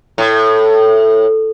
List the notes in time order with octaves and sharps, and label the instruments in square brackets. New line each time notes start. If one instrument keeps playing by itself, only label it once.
[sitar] A2